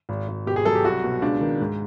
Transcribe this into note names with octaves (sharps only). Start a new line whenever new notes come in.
G#1
G#1
B2 G4
G#4
F#3 A4
G4
C2 F#4
B2
C#2 D4
D#3
G#2